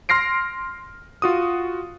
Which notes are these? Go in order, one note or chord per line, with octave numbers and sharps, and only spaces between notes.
C6 F6 A#6 C7 D7
F4 F#4 D#6